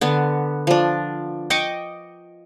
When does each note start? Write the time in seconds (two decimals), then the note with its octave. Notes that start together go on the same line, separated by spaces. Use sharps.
0.01 D3 B3
0.67 F3 D4
1.50 D#5 G5 C#6 D6